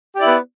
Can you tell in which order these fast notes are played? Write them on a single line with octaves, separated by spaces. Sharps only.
G4 D5 E4 B3